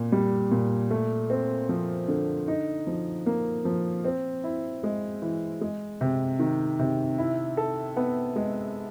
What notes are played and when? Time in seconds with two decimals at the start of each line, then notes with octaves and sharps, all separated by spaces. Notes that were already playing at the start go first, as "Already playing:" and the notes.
Already playing: A#2
0.12 G3
0.51 A#2
0.90 A3
1.30 C4
1.69 F3
2.08 D3
2.48 D#4
2.87 F3
3.26 A#3
3.65 F3
4.05 C4
4.44 E4
4.83 G#3
5.22 E3
5.61 G#3
6.01 C3
6.40 D#3
6.79 C3
7.18 E4
7.57 A4
7.97 B3
8.36 G#3